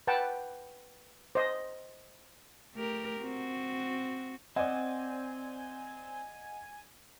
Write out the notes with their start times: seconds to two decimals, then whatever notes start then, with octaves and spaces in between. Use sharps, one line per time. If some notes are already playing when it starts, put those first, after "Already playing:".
0.07 B4 F#5 G5 A5
1.35 C5 D#5
2.74 A3 G4 A#4
3.21 C4 F#4
4.56 C4 C5 D5 D#5 F#5 G#5